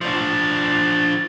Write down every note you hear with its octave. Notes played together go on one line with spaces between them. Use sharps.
F3 D4